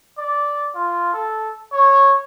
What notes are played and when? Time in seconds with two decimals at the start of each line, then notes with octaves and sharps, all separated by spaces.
0.18 D5
0.75 F4
1.13 A4
1.72 C#5